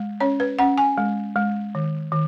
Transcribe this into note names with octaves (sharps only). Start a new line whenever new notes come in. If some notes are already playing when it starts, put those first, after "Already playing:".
Already playing: G#3
C#4 C#5
B4
C#4 F#5
G#5
G#3
G#3
D#3
D#3